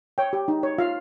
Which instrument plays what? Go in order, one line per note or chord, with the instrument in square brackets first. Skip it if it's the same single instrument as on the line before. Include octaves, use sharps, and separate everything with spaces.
[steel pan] C#5 G5
G4
D#4
C#5
F4 F5